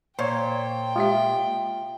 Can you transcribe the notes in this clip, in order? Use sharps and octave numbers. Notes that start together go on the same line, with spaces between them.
A#2 C5 C#5 G5
G#3 F4 G4 E5